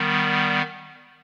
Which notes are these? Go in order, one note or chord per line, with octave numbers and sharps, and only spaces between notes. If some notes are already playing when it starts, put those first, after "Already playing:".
Already playing: D#3 G3 B3